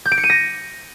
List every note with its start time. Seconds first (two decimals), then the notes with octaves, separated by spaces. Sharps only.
0.05 G6
0.11 D7
0.18 C#7
0.24 D#7
0.30 A#6